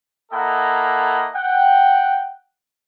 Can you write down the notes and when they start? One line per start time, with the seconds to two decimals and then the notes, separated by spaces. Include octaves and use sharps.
0.32 A#3 E4 A4 D#5 F#5 A#5
1.35 F#5 G5